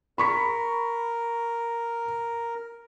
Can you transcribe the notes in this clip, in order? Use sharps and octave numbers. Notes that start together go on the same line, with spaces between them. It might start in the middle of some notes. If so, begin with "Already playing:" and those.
A#4 B5 C#6 B6